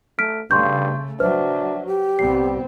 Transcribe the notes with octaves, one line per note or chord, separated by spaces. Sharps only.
A3 F6 B6 D7
G2 C#3 A3 F5 C6 C#6 G6
F#3 D4 B4 C5 E5 F6
G4
C2 G3 B3 C4 C7